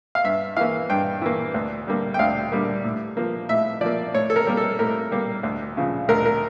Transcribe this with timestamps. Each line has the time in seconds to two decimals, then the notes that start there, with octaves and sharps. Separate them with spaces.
0.15 F5
0.24 G2 E5
0.57 E3 A#3 F5
0.89 G2 G5
1.22 E3 A#3
1.54 D2
1.87 D3 G3 A#3
2.14 G5
2.19 D2 F5
2.52 D3 G3 A#3
2.84 A2
3.17 F3 A#3
3.49 A2 E5
3.81 F3 A#3 D5
4.14 A2 C#5
4.30 A4
4.36 A#4
4.47 G3 A#3
4.57 A4
4.79 A2 A#4
5.12 G3 A#3
5.43 D2
5.77 C#3 F3
6.09 D2 A#4
6.26 A#4